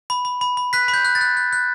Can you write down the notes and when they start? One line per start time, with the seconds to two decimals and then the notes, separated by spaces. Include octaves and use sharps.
0.10 B5
0.25 B5
0.41 B5
0.57 B5
0.73 F#6 B6
0.88 B5
0.94 G6
1.05 F#6
1.15 A6
1.21 F#6
1.37 F#6
1.53 F#6